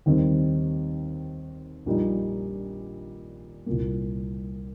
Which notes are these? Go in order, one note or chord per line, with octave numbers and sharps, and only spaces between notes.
D#2 D#3 G3 C4
A#1 A#2 G3 D#4
C2 A#2 A#3